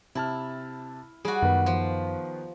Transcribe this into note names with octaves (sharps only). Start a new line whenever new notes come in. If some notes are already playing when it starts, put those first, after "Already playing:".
C3 E4 A5 F6
G3 F#4 G#4
F#2 D#3 B3 B4
F3